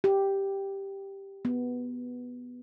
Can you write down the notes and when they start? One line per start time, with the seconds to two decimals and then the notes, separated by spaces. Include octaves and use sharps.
0.04 G4
1.45 B3